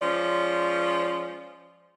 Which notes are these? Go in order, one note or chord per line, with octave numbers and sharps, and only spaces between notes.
F3 G#3 C#4 D5